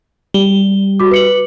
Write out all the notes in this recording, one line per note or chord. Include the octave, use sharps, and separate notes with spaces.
G3 G7
F#4 D6
B4 C#7 F#7